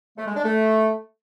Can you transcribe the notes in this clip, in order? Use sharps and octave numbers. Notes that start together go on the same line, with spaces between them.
A3
G#3
D4
A3